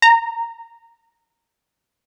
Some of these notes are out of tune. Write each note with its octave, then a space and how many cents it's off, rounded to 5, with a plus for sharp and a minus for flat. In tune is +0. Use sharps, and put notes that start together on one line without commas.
A#5 -15